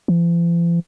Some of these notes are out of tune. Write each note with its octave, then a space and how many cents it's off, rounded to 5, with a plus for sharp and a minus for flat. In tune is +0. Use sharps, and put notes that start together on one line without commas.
F3 -45